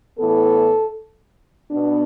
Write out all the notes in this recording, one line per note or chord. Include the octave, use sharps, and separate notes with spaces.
A2 E3 B3 A4
B2 B3 D4